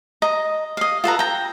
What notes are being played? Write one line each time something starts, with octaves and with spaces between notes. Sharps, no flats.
D#5 A#5
D#5 F5
F4 A4 B4 A#5
G5 A#5